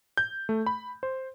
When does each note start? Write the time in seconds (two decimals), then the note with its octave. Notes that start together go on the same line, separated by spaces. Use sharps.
0.17 G6
0.49 A3
0.66 B5
1.03 C5